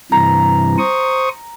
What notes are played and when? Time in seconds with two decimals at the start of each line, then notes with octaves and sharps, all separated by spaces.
0.12 G2 C3 E3 A#5
0.78 C5 C#6 D#6